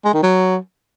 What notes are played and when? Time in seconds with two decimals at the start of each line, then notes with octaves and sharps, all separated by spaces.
0.04 G#3
0.14 D#3
0.23 F#3